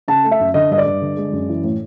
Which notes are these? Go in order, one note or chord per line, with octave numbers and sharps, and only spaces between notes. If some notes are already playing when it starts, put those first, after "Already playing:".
C#3 A5
A3
E5
F#2
D3 D#5
G2 D#5
D5
G2
D3
G#3
F#2
E3
A2